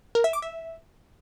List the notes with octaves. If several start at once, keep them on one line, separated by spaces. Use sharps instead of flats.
A#4
E5
D6
E5